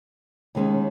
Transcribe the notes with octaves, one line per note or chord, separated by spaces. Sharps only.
D#2 D#3 G#3 C#4